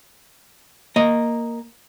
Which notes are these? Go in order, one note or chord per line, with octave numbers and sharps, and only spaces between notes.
A#3 D#5